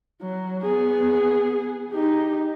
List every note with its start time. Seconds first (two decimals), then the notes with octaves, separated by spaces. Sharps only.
0.22 F#3
0.63 B3 G#4
1.93 D#4 G4